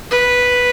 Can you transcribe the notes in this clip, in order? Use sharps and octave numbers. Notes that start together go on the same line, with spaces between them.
B4